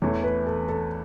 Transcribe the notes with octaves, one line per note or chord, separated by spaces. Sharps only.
E2 E3 A3 C#5
B4
A4
A4